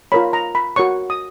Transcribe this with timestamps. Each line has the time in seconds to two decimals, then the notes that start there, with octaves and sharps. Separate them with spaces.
0.12 F4 A#4 C#5 B5
0.33 A#5
0.55 B5
0.76 F#4 A#4 C#5 C#6
1.10 D#6